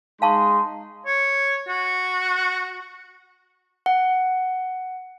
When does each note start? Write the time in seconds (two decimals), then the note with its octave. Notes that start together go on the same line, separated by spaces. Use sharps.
0.22 G#3 D#4 F5 A5 C6 C#6
1.06 C#5
1.68 F#4
3.86 F#5